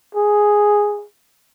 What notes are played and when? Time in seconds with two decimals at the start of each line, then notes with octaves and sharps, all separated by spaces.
0.15 G#4